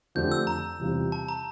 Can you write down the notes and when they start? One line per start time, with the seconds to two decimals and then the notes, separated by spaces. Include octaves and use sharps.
0.15 F2 D3 A3 D4 G4 G6
0.32 E6
0.47 A#5
0.79 E2 C3 G3 C4 F4
1.12 A5
1.28 A#5